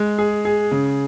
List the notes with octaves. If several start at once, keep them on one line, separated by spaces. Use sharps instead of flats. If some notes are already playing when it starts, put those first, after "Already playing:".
Already playing: G#3
G#4
G#4
C#3